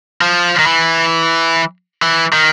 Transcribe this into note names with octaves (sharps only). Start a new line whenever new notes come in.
F3
D#3
E3
E3
D#3